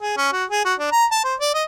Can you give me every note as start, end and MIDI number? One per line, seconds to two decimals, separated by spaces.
0.01 0.17 68
0.17 0.30 61
0.33 0.45 66
0.50 0.62 68
0.65 0.74 66
0.79 0.91 62
0.92 1.06 82
1.11 1.19 81
1.24 1.35 72
1.40 1.51 74
1.54 1.64 75